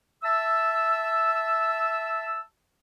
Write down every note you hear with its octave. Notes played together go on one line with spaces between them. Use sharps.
E5 A5 E6